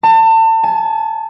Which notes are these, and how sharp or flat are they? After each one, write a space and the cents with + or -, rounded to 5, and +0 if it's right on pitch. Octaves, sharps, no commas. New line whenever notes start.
A5 +35
A5 -45